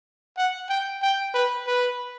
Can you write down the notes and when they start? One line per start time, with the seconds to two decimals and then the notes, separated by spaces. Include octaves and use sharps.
0.37 F#5
0.69 G5
1.02 G5
1.34 B4
1.67 B4